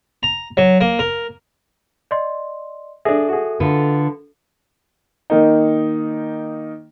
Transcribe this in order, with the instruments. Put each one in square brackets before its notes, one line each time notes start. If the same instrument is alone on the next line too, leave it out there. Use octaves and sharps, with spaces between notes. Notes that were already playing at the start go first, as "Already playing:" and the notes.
[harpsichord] A#5
F#3
A#3
A#4
[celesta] D5 D#5 C6
[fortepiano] D4 G#4 [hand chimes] A4 [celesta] E5
[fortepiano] F#4 G#4
[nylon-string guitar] D3 F4 B4
[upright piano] D#3 A#3 D#4